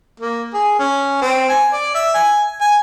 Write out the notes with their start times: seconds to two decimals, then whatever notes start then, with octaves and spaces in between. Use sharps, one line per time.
0.20 A#3
0.54 G#4
0.79 C#4
1.21 C4
1.49 G#5
1.73 D5
1.95 E5
2.14 G#5
2.61 G#5